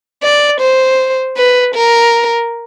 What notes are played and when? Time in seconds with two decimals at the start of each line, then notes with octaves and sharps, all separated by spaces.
0.23 D5
0.61 C5
1.37 B4
1.75 A#4